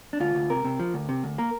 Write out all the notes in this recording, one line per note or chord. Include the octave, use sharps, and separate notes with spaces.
D4
D2 F4
D2
C3 A#4
C3
F3
D2
C3
D2
A#3 A#4